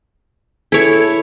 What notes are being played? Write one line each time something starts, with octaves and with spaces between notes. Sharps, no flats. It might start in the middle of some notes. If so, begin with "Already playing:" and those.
E4 G#4 A4 C#5